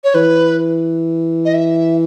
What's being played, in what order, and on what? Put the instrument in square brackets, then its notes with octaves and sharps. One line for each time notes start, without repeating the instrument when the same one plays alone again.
[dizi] C#5
[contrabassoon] E3 [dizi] B4
[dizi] D#5
E5